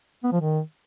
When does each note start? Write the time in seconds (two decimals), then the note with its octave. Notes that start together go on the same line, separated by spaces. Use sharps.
0.24 B3
0.32 F3
0.41 D#3